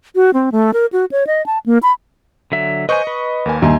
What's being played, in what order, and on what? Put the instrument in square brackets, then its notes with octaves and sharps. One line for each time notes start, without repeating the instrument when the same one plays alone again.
[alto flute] F#4
C4
A3
A#4
F#4
C#5
D#5
A5
A#3
B5
[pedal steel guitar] D3 F#3 E5
[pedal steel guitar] B4 C5 G#5 [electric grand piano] D#5 C#6
[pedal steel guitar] B4
[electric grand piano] D#2 A#3 G#5
[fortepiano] D#2 [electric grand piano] E5 G#5 C6